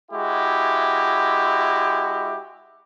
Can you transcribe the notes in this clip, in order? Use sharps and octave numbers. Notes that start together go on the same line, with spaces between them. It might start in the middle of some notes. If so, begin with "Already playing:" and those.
G#3 E4 F#4 G4